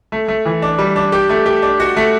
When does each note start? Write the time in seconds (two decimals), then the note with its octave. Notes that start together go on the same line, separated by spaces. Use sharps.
0.12 A3
0.28 A3
0.46 E3
0.62 D4
0.78 G3
0.96 D4
1.12 G4
1.30 A3
1.46 G4
1.62 D4
1.80 F#4
1.96 A3